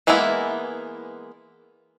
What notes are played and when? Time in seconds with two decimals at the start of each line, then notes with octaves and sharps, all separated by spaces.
0.07 E3 G#3 A#3 B3 E4